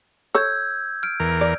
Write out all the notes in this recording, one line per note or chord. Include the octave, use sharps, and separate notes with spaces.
A4 C#5 E6 G6 G#6
F6 D7
E2 A#4
D5